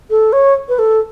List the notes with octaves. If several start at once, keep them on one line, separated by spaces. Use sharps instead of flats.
A4
C#5
B4
A4